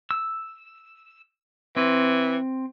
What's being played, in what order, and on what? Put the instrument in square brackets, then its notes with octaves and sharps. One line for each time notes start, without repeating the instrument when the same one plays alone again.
[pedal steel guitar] E6
[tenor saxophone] E3 [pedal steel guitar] C4